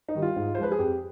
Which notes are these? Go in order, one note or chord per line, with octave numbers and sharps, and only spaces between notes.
D#4
D#3 G3
F4
G#2
C5
F3 G#3 B4
G#4
F2 G4